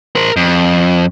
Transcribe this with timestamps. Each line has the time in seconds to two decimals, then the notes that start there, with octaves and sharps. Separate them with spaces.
0.16 A#4 C5
0.36 F2